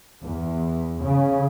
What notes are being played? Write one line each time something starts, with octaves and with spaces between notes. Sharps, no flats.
E2
C#3